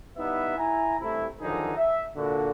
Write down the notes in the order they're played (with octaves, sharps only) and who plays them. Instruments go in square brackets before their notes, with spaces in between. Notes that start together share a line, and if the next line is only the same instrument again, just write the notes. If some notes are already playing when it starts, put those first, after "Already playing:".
[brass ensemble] G3 B3 D#4 E4 E5
E4 G#5 A#5
G2 C3 A3 E4
F#2 D3 D#3 F3 D#4 G#4
E5
A#2 D3 F#4